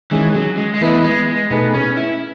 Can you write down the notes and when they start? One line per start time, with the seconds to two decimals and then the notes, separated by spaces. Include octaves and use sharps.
0.11 D#3 E3 G#3 C#4 G#4
0.35 F#3
0.57 G#3
0.74 G#3
0.81 E3 A3 B3 E4 B4 D#5
1.04 G#3
1.28 G#3
1.50 B2 A3 B3 D#4 G#4 B4
1.74 C#4
1.97 E4